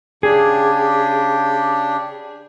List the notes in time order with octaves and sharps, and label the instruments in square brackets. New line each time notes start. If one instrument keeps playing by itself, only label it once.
[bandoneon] C#3 D4 G4 [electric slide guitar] G#4